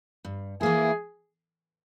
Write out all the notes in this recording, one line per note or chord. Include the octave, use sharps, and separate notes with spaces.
G2
E3 A#3 E4 G#4